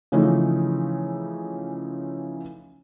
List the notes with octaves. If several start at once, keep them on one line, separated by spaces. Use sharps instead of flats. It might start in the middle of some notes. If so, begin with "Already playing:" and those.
C#3 E3 F3 A3 C#4 D#4